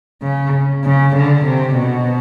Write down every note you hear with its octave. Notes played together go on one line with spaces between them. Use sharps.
C#3
C#3
D3
C3
B2